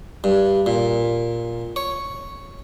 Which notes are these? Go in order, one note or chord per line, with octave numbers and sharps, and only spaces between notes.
G2
A#2
C#5